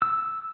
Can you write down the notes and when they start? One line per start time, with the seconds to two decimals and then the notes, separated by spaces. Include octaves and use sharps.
0.02 E6